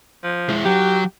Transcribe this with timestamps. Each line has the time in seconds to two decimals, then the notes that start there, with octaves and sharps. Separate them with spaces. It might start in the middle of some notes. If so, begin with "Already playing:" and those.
0.24 F3
0.49 G#3 E4
0.65 F#3 G4